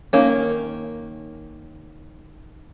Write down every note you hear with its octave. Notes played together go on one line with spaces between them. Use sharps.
D#3 A#3 C#4